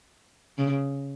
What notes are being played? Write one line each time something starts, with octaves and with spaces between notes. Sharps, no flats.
C#3